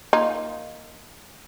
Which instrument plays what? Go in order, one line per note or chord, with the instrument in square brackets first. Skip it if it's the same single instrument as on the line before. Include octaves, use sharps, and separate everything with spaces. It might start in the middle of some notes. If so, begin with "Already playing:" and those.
[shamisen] A#3 D#4 F4